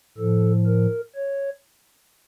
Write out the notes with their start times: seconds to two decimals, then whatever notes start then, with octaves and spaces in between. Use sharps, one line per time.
0.18 A2 F3 A4
0.67 A#4
1.16 C#5